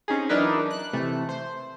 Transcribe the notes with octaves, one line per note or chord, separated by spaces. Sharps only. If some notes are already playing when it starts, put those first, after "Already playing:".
C4 C#4 D#4 G4 G#4
E3 F#3 D4 D#4 A#4 B4
F#6
C3 E3 A3
C5